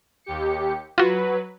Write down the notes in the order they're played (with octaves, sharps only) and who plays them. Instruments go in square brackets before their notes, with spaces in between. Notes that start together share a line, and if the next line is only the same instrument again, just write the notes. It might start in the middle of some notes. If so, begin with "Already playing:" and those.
[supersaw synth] D#2 G4 C#7
[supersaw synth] F#3 B4 [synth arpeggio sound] F4 F#4